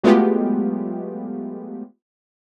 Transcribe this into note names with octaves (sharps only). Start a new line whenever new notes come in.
F#3 G#3 A3 B3 F4 G4